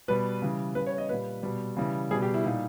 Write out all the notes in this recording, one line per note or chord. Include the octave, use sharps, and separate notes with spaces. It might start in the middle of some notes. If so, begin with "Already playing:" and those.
B2 G3 B4
C#3 E3 G3
C#3 G3 B4
C#5
D#5
A#2 G3 B4
B2 G3
C#3 E3 G3
B2 G3 G#4
G4
E4
A#2 G3 D#4